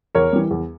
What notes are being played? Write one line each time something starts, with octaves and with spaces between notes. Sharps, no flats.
E2 A#4 C#5
E3 G3
E2